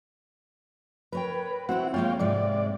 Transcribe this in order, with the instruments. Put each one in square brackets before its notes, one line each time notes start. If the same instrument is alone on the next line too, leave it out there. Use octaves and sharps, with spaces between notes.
[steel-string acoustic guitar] A#4 C#5 G5 [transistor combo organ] B4
[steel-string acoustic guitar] C4 E4 C5 [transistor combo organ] F#4 F#5
[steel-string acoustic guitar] G#3 A#3 F4 [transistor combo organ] C#5 F5 G5
[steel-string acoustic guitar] G#2 C3 G#3 [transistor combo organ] D5